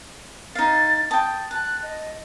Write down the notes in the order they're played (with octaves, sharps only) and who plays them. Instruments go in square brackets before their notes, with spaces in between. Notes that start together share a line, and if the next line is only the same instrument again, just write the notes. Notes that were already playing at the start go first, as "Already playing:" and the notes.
[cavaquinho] D#4 F5 [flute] A6
[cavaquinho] G5 A5 [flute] D#6
[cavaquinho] A5 [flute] F#6
[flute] D#5